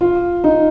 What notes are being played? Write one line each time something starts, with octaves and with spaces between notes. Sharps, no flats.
F4
D#4